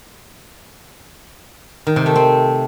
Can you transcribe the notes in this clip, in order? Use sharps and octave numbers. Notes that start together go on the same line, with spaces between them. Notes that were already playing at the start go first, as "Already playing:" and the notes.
D#3
C3
A3
C4